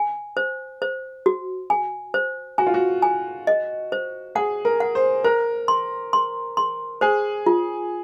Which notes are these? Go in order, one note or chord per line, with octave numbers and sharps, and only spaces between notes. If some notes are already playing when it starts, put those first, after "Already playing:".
Already playing: G#5
C5
C5
F#4
G#5
C5
F#4 G#5
F4
F#4
G#5
D#5
C5
G#4 F#5
A#4
F#5
C5
A#4 C5
C6
C6
C6
G#4 C5
F4